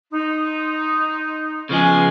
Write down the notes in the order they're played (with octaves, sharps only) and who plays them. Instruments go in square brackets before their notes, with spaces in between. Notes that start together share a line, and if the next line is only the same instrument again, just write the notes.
[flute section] D#4 C6
[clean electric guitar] C#3 F3 G#3 [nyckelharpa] B3 G#5